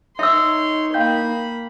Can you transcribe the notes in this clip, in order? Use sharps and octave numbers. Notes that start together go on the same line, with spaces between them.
D#4 C#5 E5 C6 E6
A#3 F5 G5 B5 G6